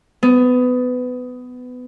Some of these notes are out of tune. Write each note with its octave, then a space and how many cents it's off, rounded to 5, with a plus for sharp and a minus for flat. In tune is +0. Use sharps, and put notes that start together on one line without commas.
B3 +20